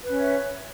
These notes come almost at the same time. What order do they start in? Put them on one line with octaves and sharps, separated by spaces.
B4 C#4 C#5 E5